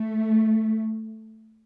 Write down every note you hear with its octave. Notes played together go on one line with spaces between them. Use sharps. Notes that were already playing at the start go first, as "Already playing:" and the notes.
Already playing: A3